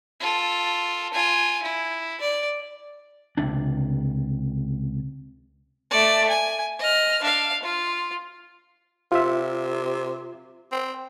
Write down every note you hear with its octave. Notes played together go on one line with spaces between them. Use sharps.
F4 A4
F4 G#5
E4
D5
C#2 C3 D4
A3 D5
G#5
D#5 F6
D4 F5
F4
C3 F4 E5
C4